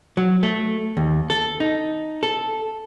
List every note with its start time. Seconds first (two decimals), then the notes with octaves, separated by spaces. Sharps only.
0.17 F#3
0.43 A3
0.97 D#2
1.30 A4
1.60 D#4
2.23 A4